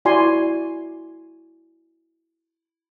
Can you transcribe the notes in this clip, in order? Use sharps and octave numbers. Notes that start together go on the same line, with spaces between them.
E4 F#4 D5 G#5 C6